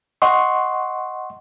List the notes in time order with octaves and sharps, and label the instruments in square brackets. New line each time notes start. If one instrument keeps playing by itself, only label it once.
[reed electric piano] D#5 F#5 C6 C#6